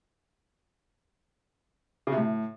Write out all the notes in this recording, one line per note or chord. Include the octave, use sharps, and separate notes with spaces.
C#3
C3
A2